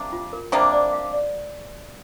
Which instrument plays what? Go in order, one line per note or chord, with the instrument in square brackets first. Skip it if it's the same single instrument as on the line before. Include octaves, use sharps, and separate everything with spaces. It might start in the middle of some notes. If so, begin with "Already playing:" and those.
Already playing: [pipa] C3 G3 A#3 D4
[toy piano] F4
A#4
[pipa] C3 G3 A#3 D4 [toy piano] C5
[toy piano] D5
F5
D5